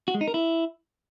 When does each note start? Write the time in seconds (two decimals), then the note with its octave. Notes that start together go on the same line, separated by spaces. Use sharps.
0.08 F#4
0.14 G#3
0.21 D#4
0.28 A#4
0.34 E4